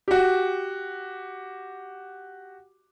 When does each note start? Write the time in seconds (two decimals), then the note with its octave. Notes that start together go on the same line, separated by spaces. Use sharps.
0.08 F#4 G4